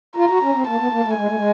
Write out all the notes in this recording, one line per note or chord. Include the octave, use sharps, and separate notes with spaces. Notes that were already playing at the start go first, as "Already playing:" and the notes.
F4 A#5
F#4
C#4
C4
A#3 A5
B3
A#3
A3
G#3 G#5
A3
G#3